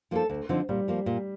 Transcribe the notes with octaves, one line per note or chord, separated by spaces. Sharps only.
F3 A#3 D#4 A4
D2
D3 F3 C4 D#4
A#2 G3
F3 A#3
A#2